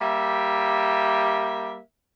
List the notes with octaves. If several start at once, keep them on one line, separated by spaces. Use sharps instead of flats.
G3 A#3 G4 E5